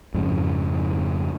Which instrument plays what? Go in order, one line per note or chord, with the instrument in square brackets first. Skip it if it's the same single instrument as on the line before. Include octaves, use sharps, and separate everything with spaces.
[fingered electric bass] F2 G#2 C#3